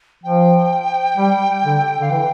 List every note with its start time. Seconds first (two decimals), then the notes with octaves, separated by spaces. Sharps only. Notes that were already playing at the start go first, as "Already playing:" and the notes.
0.23 F3 G5
1.17 G3
1.64 D3
2.00 D3 F5
2.10 E3 G5